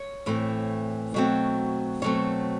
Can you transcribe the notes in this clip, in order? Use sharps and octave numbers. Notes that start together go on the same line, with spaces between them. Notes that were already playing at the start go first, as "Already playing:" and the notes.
Already playing: C#5
A2 E3 A3 C4
B2 F#3 A3 C4
B2 F#3 A3 C4 C#5